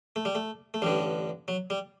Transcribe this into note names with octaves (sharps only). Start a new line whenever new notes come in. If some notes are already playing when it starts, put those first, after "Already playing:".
A3
G3
A3
A3
A1 G2 D3 G3
F#3
G3